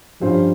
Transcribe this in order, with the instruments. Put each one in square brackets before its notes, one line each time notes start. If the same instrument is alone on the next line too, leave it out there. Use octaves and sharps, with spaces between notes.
[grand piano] G2 G3 C#4 F4 C5 [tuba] F3